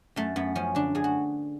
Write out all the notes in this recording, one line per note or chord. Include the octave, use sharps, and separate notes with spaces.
F#2 A3
F#2 B3
F3 C#4
D3 D4
F#2 G#4
F#4